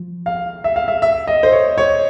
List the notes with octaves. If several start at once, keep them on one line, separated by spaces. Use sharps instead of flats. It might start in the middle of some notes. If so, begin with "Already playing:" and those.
Already playing: F3
F5
E5
F5
E5
E5
D#5
C5
C#5
C#5